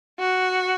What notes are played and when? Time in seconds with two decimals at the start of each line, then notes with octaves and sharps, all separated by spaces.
0.19 F#4